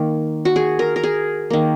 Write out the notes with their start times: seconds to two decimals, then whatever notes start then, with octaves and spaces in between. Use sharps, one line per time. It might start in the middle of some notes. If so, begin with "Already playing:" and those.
Already playing: D#3 A#3
0.45 F#4
0.56 G#4
0.79 A#4
0.96 A#4
1.04 G#4
1.50 D#3 A#3